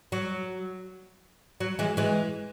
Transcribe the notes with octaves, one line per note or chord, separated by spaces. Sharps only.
F#3
F#3
E3 G#3
E3 G#3